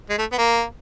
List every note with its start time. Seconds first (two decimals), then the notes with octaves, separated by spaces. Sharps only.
0.10 G#3
0.18 A3
0.32 B3
0.38 A#3